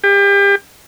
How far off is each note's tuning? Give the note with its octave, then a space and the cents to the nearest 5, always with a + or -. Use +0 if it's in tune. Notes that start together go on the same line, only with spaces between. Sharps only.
G4 +35